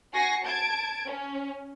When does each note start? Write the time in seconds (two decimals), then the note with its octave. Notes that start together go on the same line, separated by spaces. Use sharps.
0.14 F#4 G#5 C#6 A#6 C7
0.44 A5 G#6 D7
1.09 C#4